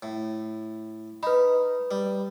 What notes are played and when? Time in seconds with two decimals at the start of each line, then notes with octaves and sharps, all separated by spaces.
0.03 A2
1.23 D#4 B4 B5
1.91 G3